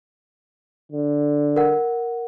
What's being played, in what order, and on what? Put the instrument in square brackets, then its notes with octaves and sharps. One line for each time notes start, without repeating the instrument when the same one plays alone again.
[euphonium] D3
[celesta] A#4 F#5